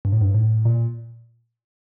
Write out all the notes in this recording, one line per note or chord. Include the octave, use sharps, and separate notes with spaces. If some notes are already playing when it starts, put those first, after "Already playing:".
G2
A2
G2
A2
A#2